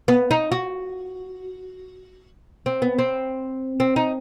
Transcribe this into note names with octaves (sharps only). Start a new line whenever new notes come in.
B3
D#4
F#4
C4
B3
C4
C4
D#4